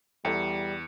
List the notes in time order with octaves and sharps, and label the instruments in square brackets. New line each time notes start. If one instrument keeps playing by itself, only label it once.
[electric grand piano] E2 [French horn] G3 [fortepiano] E4 A4 G5 [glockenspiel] C#7